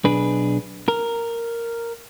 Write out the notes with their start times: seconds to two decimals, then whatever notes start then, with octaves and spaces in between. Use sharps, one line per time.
0.05 B1 D4 G#4 B4
0.88 A#4